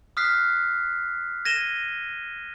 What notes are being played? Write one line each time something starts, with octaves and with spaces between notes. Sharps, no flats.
D#6 F6 F#6 B6 C7
G#6 A#6 D#7 E7 G7